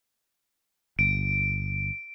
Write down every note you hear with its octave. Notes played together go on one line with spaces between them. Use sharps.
G1 D7